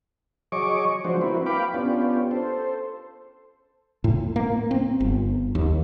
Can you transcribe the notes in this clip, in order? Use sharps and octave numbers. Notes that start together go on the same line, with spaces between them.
F#3 G#4 C#5 D#5 C#6 D6
F3 F#3 G#3 D4 F#4 C5
A#3 C4 E4 F#4 B4
B4 F5 G5 B5 D6
B3 C#4 D4 F4 G4
A4 C5
A2
A#3
C4
G1
D#2